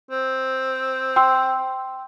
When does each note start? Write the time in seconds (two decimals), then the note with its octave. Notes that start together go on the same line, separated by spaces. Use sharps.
0.11 C4
1.16 G5 C6 E6